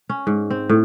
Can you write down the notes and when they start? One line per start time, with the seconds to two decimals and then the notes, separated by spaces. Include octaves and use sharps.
0.10 C#4
0.27 G#2
0.50 C4
0.69 A2